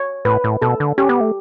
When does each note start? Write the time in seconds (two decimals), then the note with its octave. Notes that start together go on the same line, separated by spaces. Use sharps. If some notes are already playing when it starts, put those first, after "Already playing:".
Already playing: C#5
0.25 A2 B4
0.44 A2
0.62 B2 A4
0.80 D3
0.98 C#4 G4
1.09 B3
1.21 A3